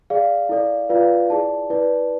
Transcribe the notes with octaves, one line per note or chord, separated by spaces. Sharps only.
G#4 D5 F5
E4 A4 D5
F4 B4 D5 F5
E4 G#4 D5 A5
E4 B4 D5